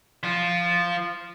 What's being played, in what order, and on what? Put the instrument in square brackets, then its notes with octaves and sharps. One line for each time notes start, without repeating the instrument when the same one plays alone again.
[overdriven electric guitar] F3 F4